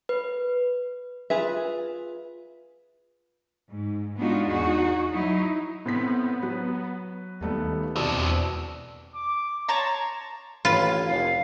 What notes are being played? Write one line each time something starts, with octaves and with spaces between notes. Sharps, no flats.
B4
F4 G#4 B4 E5
G#2
G#3 B3 D4 D#4 F4 F#4
E2 D#4 F#4 G#4
F#3 D#4 E4
A2 B3 C4 B6
F#3 B4
D#2 G3 A3 B3
B2 C4 D4
E2
D6
C#5 A5 A#5 C6
A1 F4 B4 C#5
F1 F5